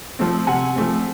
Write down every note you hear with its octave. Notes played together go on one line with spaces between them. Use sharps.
F3 A3 C4
C3 F#5 G#5
F3 A3 C4